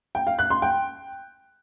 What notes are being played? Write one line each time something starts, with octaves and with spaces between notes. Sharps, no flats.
G5
F5
F#6
C6
G5